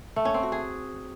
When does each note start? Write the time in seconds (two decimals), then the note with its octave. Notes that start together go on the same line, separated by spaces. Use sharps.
0.16 A3
0.25 C#4
0.34 C4
0.43 F#4
0.52 G#4